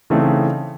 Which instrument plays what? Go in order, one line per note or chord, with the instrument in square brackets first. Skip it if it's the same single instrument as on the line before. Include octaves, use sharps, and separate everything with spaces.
[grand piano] C#3 E3 A3 C4 D#4